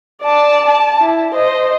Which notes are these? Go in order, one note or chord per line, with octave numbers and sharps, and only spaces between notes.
D5 A5
A5
E4
C5 D#5